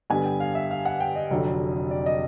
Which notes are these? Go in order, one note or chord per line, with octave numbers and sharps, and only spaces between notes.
G2 D3 G3 B3 G#5
G5
F5
E5
F5
F#5
G5
D#5
F1 F2 D3 F#3
D5
D#5